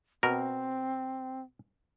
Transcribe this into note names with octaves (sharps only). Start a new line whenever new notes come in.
B2 C4 A#4